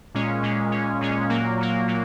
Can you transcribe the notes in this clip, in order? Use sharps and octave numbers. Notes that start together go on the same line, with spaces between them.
A#2 G#3 C#4
A#2 G#3 C#4
A#2 G#3 C#4
A#2 G#3 C#4
A#2 F#3 A#3
A#2 F#3 A#3
A#2 F#3 A#3